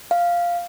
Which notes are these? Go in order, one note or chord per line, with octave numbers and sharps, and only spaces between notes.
F5